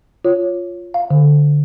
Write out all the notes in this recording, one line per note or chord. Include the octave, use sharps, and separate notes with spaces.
F4 C#5
F5
D3